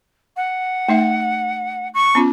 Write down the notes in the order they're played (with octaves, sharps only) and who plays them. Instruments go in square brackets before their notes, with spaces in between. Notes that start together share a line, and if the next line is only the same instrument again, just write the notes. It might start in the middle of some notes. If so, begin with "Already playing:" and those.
[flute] F#5
[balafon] A3 D#4 E5
[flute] C#6
[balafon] B3 C#4 F4